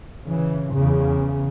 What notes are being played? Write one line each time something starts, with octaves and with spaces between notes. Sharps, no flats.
C#3 E3
E2 C#3